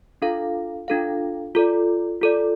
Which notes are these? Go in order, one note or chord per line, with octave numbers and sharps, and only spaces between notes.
D4 F4 A4 F5
D4 F4 A4 F5
F4 A4 D5
F4 A4 D5